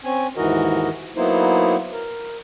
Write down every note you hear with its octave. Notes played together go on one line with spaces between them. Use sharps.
C4 C#4 G#5
D#2 G#2 E3 F#4 A#4 D#5
F#3 A#3 B3 D#4 E4 C5
A#4